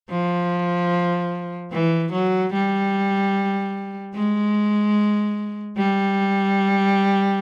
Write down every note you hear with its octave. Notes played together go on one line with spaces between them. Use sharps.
F3
E3
F#3
G3
G#3
G3